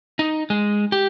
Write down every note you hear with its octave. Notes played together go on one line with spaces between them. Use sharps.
D#4
G#3
G4